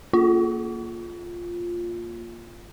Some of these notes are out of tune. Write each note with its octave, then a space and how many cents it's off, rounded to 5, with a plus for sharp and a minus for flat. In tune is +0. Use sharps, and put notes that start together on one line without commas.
A#3 +0 F4 +0